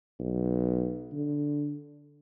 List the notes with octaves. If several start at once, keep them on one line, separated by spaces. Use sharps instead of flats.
B1
D3